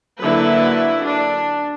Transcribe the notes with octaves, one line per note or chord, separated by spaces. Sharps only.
D3 F#3 A#3 E4 B4
D4